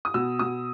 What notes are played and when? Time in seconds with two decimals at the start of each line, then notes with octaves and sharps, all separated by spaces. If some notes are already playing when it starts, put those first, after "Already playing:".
0.05 D#6
0.14 B2 E6
0.39 B2 D#6